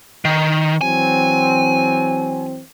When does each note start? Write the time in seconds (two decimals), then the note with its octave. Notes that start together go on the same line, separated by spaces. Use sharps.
0.25 D#3
0.81 E3 F#3 C4 G#5